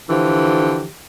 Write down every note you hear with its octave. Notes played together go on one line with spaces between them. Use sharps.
D3 E3 F3 G4